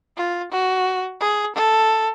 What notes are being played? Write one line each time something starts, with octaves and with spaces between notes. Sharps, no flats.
F4
F#4
G#4
A4